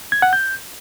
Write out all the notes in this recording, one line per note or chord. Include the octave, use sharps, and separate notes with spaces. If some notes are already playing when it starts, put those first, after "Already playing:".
G#6
F#5
G6